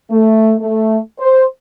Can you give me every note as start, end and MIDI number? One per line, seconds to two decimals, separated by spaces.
0.11 0.54 57
0.60 0.98 57
1.19 1.43 72